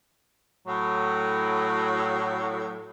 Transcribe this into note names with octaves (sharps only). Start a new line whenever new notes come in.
A2 F#3